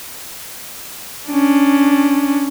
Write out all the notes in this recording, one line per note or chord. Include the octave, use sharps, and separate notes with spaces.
C#4 D4